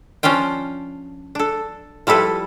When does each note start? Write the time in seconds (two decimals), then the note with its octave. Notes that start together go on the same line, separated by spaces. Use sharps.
0.23 F3 C#4 D4 F4 G5
1.35 D4 A4
2.07 F3 G3 E4 A4 B4